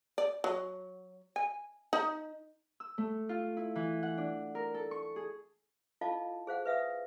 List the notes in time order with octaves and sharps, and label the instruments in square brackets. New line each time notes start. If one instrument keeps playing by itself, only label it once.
[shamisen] D5
F#3
G#5
D#4
[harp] E6
A3
F4
E4
E3
F#5
D4
A#4
A4
C#6
G#4
[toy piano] E4 F4 A4 D#5 F5 A5
G#4 C5 F5 F#5
B4 E5 F5 D#6